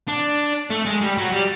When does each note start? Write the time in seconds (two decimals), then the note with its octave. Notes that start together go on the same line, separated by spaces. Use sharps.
0.08 D4
0.70 A3
0.86 G#3
1.02 G3
1.18 F#3
1.32 G3